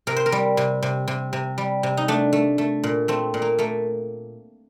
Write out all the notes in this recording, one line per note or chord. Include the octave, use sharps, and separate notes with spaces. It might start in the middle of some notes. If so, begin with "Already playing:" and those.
C3 A#4
C5
A#4
G3
C3
C3
C3
C3
G3
C3
D#4
A3 D4
A3
A3
A#2
A3 C4
A#2
A#3
A3 A#3